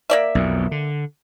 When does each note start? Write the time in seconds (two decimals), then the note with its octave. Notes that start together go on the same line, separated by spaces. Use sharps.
0.10 A#3 D5 E5
0.35 B1 F2
0.71 D3